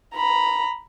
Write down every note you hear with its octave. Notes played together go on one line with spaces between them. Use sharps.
A#5 B5